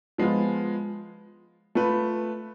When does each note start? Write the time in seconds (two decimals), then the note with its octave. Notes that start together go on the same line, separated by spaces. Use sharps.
0.18 F3 G#3 B3 F4
1.75 A3 F4 B4